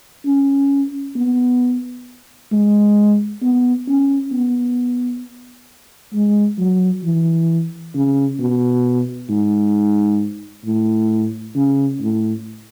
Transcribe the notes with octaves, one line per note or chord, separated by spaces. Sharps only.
C#4
B3
G#3
B3
C#4
B3
G#3
F#3
E3
C#3
B2
G#2
A2
C#3
A2